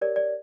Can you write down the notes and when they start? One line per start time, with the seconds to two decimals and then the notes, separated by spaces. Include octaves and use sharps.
0.01 G4 A#4 C#5 D5
0.16 D5